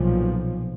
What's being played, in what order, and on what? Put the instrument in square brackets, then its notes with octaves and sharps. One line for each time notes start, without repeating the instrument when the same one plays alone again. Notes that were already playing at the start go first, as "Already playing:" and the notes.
Already playing: [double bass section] B1 A#2 F3